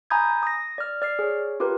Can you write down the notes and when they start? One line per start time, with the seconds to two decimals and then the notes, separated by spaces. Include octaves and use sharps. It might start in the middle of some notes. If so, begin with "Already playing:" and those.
0.10 G#5 A#5 B5 D#6 G6 G#6
0.43 D#6 A#6
0.78 D5 F6
1.02 D5 F6 C7
1.19 G#4 C#5
1.60 F4 G4 A#4 B4